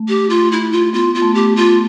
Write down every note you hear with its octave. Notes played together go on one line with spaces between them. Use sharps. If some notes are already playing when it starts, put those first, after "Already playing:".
Already playing: A3
G4
F4
E4
F4
B3 F4
F4
A3
G4
F4